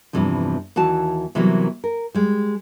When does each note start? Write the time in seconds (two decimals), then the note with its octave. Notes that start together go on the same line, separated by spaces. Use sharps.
0.13 E2 G2 C3 E3 F3
0.76 D#2 E3 F#4 A5
1.35 C3 E3 F#3 G3 A#3 B3
1.84 A#4
2.15 G3 G#3